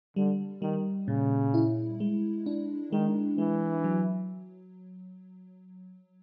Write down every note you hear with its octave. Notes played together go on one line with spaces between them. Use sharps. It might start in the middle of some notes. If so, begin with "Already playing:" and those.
D3 G3
D#3 G3
A#2 C#3
E4
G#3
D4
D#3 G#3
E3 G#3
F#3